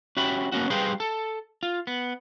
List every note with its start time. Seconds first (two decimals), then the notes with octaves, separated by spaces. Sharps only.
0.17 C#4 F#4 G4 E5 B5
0.52 A#3 B3 C#4 F#4
0.70 G3 G#4 B4 C5 F5 G5
1.00 A4
1.63 F4
1.87 B3